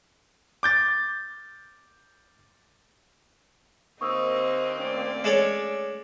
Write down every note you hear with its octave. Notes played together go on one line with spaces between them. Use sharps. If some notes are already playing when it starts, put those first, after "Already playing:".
D6 G6 A6
D#2 A#3 C4 D#4 C#6 D#6 E6
A3 C#4 D5
G#3 A4 C#5 D6 F#7